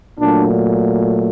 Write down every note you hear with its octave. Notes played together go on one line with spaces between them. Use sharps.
A#2 F#3 A3 D4